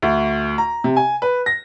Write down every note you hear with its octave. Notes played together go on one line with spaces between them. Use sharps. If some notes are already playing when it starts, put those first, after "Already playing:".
D2
A#5
C3
G#5
B4
A#6